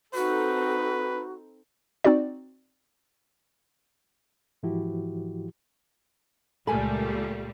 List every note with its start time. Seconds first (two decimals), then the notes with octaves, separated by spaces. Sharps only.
0.14 C4 D#4 F#4 A4 B4
2.04 C4 D#4 F#4 D5
4.63 G#2 E3 F3 E4 F#4 G4
6.67 C#2 A#2 G3 A3 A4 A#4 G#5 B5